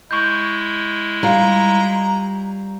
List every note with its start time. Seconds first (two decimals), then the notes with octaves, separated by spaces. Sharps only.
0.11 G#3 E4 C#6 G6
1.23 G3 F4 A#5